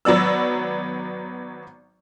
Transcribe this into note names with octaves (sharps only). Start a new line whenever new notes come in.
G#1 F#3 B3 D5 E6